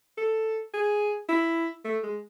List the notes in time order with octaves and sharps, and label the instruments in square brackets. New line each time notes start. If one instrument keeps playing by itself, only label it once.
[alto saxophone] A4
G#4
E4
A3
G#3